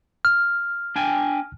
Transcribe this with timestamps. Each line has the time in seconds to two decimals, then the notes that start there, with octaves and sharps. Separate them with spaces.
0.25 F6
0.96 D4 G5 G#5